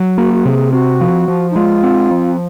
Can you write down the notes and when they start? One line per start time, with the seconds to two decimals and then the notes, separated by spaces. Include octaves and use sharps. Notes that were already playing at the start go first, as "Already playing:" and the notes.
Already playing: F#3
0.18 A#3 F#4
0.34 F#4
0.45 C3 G#4
0.73 C4 F#4
1.01 F3
1.28 F3
1.51 D#4
1.56 G#3 F4
1.83 C4
2.11 F3